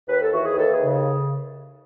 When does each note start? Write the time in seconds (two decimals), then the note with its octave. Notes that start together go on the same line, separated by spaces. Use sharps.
0.09 D#2 B4
0.22 A4
0.33 E3 F#4
0.45 G#4
0.57 D#2 A4
0.73 G#4
0.81 C#3